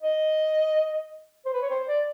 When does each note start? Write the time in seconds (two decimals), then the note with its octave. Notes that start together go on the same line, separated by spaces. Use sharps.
0.02 D#5
1.46 C5
1.53 B4
1.62 C#5
1.70 C5
1.88 D5